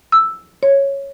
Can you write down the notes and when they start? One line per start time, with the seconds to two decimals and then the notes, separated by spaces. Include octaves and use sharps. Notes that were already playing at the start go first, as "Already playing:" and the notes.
0.12 E6
0.63 C#5